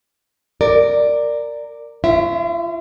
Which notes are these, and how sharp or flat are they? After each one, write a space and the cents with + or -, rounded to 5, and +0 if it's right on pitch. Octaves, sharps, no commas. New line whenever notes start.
A#4 -10 D5 +5
F4 -45 C#5 -40 E5 +0